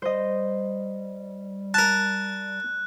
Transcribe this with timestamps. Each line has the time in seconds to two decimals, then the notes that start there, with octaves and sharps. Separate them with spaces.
0.02 G3 C5 D#5
1.74 A#4 A5 F#6